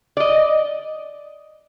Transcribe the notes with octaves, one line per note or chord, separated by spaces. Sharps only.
D5 D#5